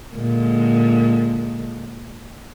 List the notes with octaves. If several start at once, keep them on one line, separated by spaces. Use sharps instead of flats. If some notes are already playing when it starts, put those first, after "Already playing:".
A#2 D3 G#3